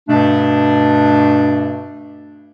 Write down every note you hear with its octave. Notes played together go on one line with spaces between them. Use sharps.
G2 B2 A3 D4